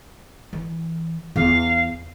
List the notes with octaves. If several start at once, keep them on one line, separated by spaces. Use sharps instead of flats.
E3
E2 F5